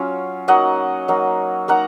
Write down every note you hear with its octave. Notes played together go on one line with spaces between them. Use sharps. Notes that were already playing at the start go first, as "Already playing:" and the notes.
Already playing: F#3 C#4 F4
F#3 A#3 D#4 D#5 F#5
F#3 A#3 D#4
A#3 D#4 F#5 A#5